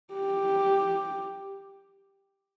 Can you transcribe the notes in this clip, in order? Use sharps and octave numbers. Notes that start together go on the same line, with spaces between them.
G4